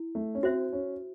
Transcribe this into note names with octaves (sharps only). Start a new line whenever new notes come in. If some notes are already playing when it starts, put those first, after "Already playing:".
Already playing: E4
A3
C#4
C4 F#4 C5 E5
C#4